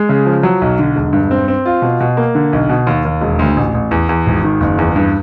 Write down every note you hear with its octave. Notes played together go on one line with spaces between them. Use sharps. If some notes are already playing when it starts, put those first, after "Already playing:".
Already playing: G#3
C#3
F3
F#3
B1
D3
E1
G2
C4
C4
F4
B2
B2
A#3
D3
B1
B2
D#2
D#2
E1
D2
A1
A1
E2
E2
G#1
D#3
F#1
E2
G2